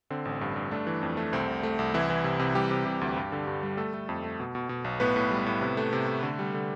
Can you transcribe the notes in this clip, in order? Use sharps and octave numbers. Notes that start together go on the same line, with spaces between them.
D3 C4
A1
G2
G2
A3 D4
E3
F2
A3
C2 C4
C2
A3
C2
C2 E3 E4
E3
C3
C3
E3 G3 G4
C3
C3
D2
G2
D3
G2
G3
A3 A4
A3
F2
A3
B2
B2
B2
B1
A2 B3 B4
A2
G3
A2
C3
A3
C3
A3
D3
G3
D3